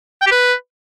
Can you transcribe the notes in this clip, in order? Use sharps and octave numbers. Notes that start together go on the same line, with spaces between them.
G5
G4
B4